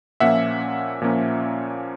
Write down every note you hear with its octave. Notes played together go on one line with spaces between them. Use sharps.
A#2 F3 A#3 C#4 E5 F#5
A#2 F3 A#3 C#4